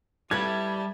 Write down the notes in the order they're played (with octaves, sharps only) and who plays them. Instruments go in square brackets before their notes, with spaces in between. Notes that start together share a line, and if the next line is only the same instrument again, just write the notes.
[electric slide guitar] G3 [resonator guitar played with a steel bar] E4 A4 B4 [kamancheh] E5 A5 [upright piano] G#6